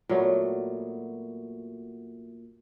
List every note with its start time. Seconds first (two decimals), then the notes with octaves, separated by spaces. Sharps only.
0.09 A#2 F#3 A3 B3